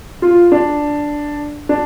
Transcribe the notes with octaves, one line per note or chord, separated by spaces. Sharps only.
F4
D4
D4